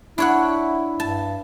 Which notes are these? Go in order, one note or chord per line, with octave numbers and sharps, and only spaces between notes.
D4 E4 C#5 F#5
G2 A5